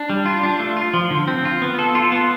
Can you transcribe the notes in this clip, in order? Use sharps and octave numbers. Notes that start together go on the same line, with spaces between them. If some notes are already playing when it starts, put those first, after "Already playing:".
Already playing: D4
G3
F4
D4
A3
F4
F3
D3
C4
F4
B3
A4
F4
B3